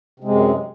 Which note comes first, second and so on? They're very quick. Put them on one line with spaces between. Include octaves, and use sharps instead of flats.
C3 G#3 F#2